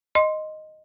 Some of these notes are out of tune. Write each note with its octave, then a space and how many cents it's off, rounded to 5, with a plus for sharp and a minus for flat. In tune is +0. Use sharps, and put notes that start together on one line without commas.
D#5 +0 C6 +0